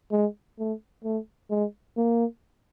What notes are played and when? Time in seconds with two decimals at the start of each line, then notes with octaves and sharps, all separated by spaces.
0.12 G#3
0.59 A3
1.04 A3
1.51 G#3
1.97 A#3